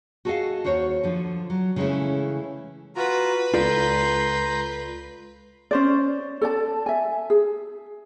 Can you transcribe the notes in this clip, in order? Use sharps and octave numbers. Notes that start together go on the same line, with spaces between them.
F#4 G#4 A4 C#5 D#5 F5
D#2 F#4 C5 C#5
D3 F3
F#3
C#3 E3 G#3 A3 C#4 E4
F4 F#4 B4 A#5
C#2 F4 A4 D5 A#5 C6 G6
C#4 C5 D5
A4 D5 A5
E5 G#5
G#4